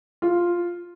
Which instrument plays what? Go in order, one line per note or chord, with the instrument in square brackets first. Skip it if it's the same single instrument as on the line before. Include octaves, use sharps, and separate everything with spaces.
[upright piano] F4